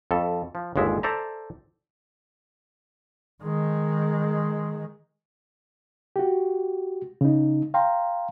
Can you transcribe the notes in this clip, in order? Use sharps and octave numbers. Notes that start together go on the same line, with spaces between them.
F2 A4
F3
G1 D#2 G#3 D5 E5
A4 C5 D5 E5 A#5
D#3 G#3
F#4 G4
C#3 D#4
F5 G5 A#5 C6